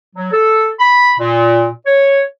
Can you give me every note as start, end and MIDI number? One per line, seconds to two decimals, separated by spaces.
0.16 0.29 54
0.32 0.69 69
0.79 1.13 83
1.19 1.67 46
1.86 2.21 73